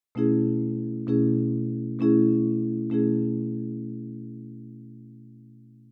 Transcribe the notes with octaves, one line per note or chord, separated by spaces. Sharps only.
B2 A3 C#4 E4 G#4
B2 A3 C#4 E4 G#4
B2 A3 C#4 E4 G#4
B2 A3 C#4 E4 G#4